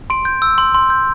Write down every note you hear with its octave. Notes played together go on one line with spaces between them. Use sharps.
C6 D7
G6
E6
C6
C6
G6